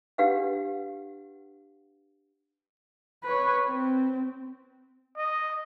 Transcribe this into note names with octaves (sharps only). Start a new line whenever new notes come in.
D4 G4 B4 F5 F#5
B4 C#5
C4
D#5